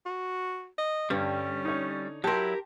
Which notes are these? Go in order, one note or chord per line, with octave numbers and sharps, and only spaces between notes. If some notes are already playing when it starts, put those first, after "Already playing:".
F#4
D#5
G2 D3 G3 C#4
D#4 C#5
F#3 E4 G4 A#4 A5 C6